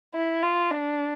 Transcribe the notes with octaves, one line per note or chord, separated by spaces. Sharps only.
E4
F4
D4